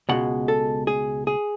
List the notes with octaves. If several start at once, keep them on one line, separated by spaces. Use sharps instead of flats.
C#2 B2 G#3 F#5
A4
G#4
G#4